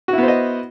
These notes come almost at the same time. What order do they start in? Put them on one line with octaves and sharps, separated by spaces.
F#4 E4 B3 C5 D#5